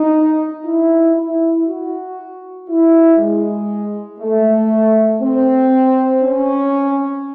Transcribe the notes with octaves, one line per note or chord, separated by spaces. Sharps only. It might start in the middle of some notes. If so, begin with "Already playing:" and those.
Already playing: D#4
E4
E4
F#4
E4
G#3
A3
C4
C#4